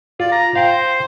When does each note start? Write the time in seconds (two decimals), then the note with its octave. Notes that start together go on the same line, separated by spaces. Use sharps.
0.20 F4 D5
0.32 A#5
0.55 C5 F5 G5